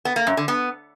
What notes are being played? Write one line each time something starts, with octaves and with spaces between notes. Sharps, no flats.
B3
A#3
F#2
D3
B3